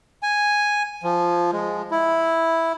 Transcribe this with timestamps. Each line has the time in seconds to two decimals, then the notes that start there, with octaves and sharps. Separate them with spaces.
0.23 G#5
1.03 F3
1.53 G#3
1.91 E4